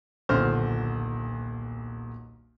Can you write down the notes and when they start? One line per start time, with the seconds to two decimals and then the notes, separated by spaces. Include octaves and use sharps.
0.29 D#1 B1 D3 C5 F6